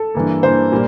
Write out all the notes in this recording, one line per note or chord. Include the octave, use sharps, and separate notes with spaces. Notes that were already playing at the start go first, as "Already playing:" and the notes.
Already playing: A4
G2 E3 A#3
G2 E3 A#3 C5
A#2 G3 A#3